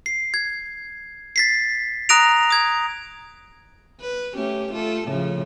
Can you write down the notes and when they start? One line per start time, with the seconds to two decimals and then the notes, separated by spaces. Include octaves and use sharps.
0.06 C7
0.34 G#6
1.36 A6 B6 C7
2.09 A#5 D#6 F#6 A#6 D7 F7
2.50 D#6 G#6
4.01 B4
4.35 A3 C#4 G4
4.73 A3 F4 A4
5.08 A2 C#3 F3